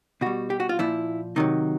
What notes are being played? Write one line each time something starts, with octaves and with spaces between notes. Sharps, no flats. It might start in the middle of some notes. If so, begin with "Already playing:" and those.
B2 G3 F#4
G4
F#4
F4
A#2 F3 E4
C3 D#3 F#3 D#4